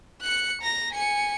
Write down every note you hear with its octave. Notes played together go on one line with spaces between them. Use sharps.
F#6 C#7
A#5 A#6
G#5 C#7